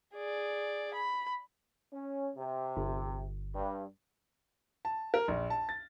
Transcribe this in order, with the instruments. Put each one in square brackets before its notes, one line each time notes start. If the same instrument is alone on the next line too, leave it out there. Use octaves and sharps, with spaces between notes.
[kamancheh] G#4 D5
B5
[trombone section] C#4
C3
[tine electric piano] G1
[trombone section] G2
[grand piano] A5
A#4
A#1
A5
A6